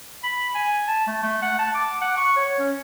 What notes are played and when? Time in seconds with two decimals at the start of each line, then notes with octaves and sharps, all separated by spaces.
0.23 B5
0.54 G#5
0.88 A5
1.07 A3
1.23 A3
1.42 F#5
1.59 A5
1.74 D6
2.01 F#5
2.17 C#6
2.36 C#5
2.58 C#4